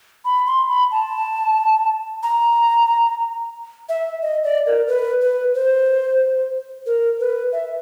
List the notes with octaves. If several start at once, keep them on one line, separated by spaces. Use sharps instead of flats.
B5
C6
B5
A5
A#5
E5
D#5
D5
A#4
B4
B4
C5
A#4
B4
E5